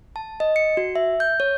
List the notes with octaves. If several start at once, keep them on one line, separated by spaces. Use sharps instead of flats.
A5
D#5
C#7
F#4
E5
G6
C#5